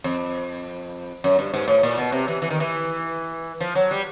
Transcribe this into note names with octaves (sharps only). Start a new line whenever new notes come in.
F2
F#2
G2
G#2
A2
A#2
B2
C3
E3
E3
D#3
E3
F3
F#3
G3